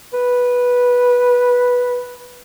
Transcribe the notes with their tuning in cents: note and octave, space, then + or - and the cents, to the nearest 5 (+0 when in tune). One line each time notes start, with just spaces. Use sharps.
B4 -10